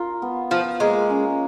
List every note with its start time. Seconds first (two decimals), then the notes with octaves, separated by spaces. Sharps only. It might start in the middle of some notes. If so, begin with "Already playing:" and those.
Already playing: F4 A#4
0.22 B3
0.51 F3 F4
0.80 G#3 A#3
1.10 C#4